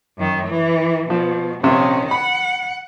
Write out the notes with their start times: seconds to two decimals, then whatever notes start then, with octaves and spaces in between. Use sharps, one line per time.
0.16 F#2 D#3
0.47 E3
1.10 B2 F3
1.63 A#1 C3 D#3 C#4
2.11 F#5 B5